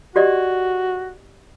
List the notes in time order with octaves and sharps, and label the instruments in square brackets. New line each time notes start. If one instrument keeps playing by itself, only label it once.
[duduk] F#4 [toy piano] G4 D5 D#5